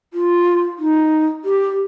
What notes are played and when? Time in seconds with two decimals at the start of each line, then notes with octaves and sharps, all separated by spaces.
0.14 F4
0.79 D#4
1.45 G4